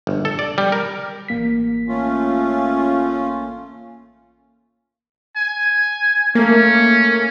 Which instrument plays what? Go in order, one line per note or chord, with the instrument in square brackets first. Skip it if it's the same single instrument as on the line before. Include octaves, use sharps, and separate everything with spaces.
[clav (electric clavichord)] G1
A4
D5
G3
A#4
[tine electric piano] A1 A#3 B6
[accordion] A3 C#4 F4
[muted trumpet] G#5
[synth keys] A3 A#3 [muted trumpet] C#4